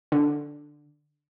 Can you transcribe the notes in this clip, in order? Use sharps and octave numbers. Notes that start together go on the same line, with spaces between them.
D3